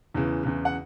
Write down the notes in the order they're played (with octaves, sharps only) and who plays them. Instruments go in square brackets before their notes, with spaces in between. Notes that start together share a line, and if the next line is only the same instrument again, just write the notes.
[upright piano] E2 C#3 E3
E2 C#3 E3
F#5